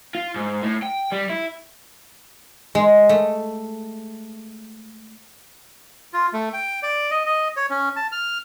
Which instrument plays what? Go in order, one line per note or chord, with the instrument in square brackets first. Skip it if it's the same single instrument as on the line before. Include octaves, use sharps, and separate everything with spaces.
[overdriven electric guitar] F4
G#2
A2
G5
G3
E4
[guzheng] G#3
A3
[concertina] F4
A3
G5
D5
D#5
D#5
C#5
C#4
A5
F6